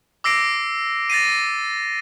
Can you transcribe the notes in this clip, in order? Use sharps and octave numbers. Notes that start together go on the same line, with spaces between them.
D6 E6 A#6 C7 D7
A6 A#6 C7 D#7